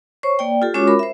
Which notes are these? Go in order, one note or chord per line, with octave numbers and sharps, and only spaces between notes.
C5 C#5 C#6
A#3 D5 G5
F4 G4 A4
G#3 C#4 F4 F#4 C#5 D6
A#4 B5
C5 E5